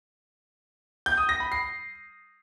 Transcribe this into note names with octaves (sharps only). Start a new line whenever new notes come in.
G6
D#6
A#6
B5
C7